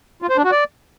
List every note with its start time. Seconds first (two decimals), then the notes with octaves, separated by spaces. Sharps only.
0.22 F4
0.30 C5
0.37 D4
0.44 F#4
0.52 D5